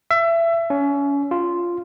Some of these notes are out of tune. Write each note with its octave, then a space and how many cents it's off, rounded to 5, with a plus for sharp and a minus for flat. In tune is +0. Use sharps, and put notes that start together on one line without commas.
E5 +25
C#4 +30
F4 -5